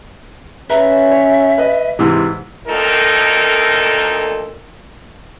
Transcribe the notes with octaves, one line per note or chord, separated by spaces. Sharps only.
C#4 B4 E5 A#5
C#5
B4 D#5
G#2 C3 E3
D2 A#2 D#3 D#4 A4 A#4